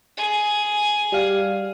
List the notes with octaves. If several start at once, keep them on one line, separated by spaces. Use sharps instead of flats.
G#4
G3 F5